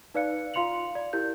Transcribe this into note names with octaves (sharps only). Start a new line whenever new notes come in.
D#4 B4 D5 F5 F#6 C#7
F4 F5 C6 C#7 F7 F#7
D5
E4 G4 A#4 G6